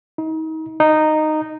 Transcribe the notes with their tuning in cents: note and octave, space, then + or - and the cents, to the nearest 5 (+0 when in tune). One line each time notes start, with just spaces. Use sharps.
D#4 +35
D#4 -10